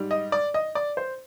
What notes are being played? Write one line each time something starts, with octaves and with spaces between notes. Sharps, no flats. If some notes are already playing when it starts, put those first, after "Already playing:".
Already playing: G#2 G3
D#5
D5
D#5
D5
C5